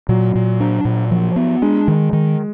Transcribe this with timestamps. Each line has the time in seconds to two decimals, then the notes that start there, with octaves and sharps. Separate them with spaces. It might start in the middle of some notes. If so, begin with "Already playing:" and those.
0.09 A#2 F#3
0.35 A#2
0.60 D4
0.85 A#2
1.11 F3
1.36 B3
1.62 G#3 D4
1.88 D#3
2.13 D#3